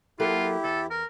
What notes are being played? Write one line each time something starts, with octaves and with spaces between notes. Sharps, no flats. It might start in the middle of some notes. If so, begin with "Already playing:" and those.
F#3 A#3 E4 F4 G4 A4
E2 A4
A#4